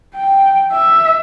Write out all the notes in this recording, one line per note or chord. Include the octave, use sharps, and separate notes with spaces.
G5
E5